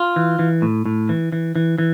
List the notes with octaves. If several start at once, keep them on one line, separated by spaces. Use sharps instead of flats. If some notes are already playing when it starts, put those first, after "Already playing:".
Already playing: F4
E3
E3
A2
A2
E3
E3
E3
E3